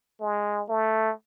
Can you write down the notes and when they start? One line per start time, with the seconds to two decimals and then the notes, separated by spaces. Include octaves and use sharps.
0.21 G#3
0.69 A3